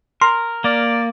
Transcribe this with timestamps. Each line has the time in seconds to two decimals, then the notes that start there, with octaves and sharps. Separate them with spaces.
0.22 A#4 C6
0.64 A#3 D5